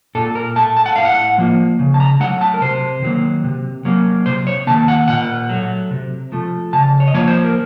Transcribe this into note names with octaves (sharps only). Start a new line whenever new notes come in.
A#2 A4
A#4
A3 A5
A5
F#5
A2 F5
F#5
F3 A#3
C#3
A5
A#5
F#3 A3 F#5
A5
A#4
C3 C5
D#3 F#3 A#3
C3
F#3 A#3
C3 C5
C#5
D#3 A#3 A5
F#5
A#2 F#5
F#3 A3
C3
F3 A3
C#3 A5
C#5
D#5
F3 A#3 C#5
C5
A#4